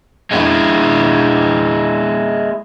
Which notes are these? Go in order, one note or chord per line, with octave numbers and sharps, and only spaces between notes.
G#3 E4